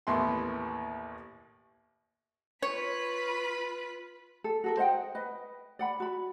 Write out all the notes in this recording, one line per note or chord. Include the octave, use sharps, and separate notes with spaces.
A1 D#2 B3 E4 C6
F4 B4 C#5 B5
A4
F#4 A4 A#4
C5 D#5 F#5 G5
B4 D#5
D5 F#5 B5
F#4 B5